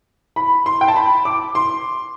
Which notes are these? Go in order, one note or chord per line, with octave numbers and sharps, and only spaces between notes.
B5
C6
G5
A5
B5
D6
C6